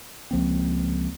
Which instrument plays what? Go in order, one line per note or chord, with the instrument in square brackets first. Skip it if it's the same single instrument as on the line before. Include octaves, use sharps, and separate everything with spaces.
[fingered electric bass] C#2 F3 A#3 C4